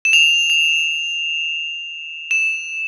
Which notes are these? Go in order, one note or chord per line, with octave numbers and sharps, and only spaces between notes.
E7
F7
F7
E7